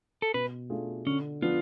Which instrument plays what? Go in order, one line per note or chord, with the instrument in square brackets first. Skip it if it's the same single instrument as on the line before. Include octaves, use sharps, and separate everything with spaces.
[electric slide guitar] A4
[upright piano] B2 [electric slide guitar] B4
[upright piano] A3 D4 F4 G#4
[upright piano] D3 [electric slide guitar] C#4
[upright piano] F3 B3 D4 [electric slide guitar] F4